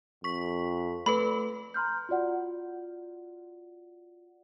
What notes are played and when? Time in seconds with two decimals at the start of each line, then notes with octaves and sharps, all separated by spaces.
0.24 F2 C#6 B6
1.06 A3 A4 B4 B5
1.74 A#5 C6 F6 G6
2.09 F4 F#4 D5 F#5